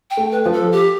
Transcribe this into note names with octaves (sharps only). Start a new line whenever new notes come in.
G5
A3
B4
F3 B4
A4
G4